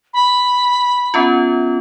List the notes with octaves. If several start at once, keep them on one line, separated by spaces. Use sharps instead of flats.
B5
B3 C#4 F4